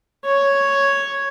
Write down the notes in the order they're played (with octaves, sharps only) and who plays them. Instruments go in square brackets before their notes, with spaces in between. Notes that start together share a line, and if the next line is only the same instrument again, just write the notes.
[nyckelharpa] C#5